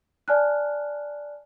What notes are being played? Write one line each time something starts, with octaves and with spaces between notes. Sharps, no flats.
D5 G#5 A5 F6 F#6